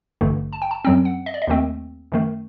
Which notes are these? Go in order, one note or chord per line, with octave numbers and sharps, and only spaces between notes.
A1 G2 D3 A3
A5
G5
A5
F#2 F#3 C4 G5
F#5
D#5
D5
D#5
D#2 D#3 A3 C4
F#2 D#3 A3